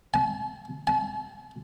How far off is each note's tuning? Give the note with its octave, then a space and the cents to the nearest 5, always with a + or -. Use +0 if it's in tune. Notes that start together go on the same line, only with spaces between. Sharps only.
A5 -45
A5 -45